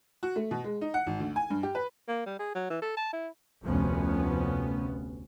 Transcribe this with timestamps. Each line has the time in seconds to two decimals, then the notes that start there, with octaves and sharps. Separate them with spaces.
0.23 F#4
0.36 A3
0.51 B2
0.64 G#3
0.81 D#4
0.94 F#5
1.07 G#1
1.20 D2
1.36 G#5
1.50 G2
1.63 G4
1.75 B4
2.08 A#3
2.26 G3
2.39 G#4
2.55 F#3
2.70 E3
2.82 A4
2.97 A5
3.13 E4
3.64 F1 D2 C3 F3 B3 C#4